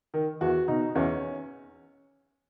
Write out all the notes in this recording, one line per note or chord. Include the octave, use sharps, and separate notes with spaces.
D#3
E2 F#4
B2 D#4
E2 C#4